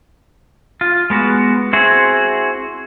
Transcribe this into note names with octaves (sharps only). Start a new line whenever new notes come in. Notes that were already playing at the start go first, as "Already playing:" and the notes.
F4
G#3 B3 F#4
C4 E4 F#4 G#4